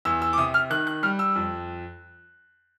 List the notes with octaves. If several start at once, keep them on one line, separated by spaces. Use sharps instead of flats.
E2 E6
E6
D6
C3 D#6
F6
D#3 F#6
F#6
G3 F6
E6
F2